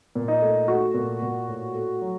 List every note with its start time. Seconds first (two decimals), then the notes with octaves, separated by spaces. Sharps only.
0.15 A#2
0.28 D#4
0.41 A3
0.68 A3 F#4
0.94 A#2
1.22 A#2
1.48 A2
1.75 A3
2.01 F#3